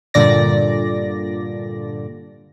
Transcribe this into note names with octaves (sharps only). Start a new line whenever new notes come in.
G2 A#2 D3 D5 A#6